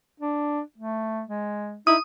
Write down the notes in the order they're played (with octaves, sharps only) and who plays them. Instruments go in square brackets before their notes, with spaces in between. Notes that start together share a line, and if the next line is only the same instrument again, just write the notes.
[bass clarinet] D4
A3
G#3
[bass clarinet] D#4 [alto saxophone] E4 [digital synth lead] D#6